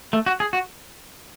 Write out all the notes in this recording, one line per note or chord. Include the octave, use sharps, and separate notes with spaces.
A3
F#4
G#4
F#4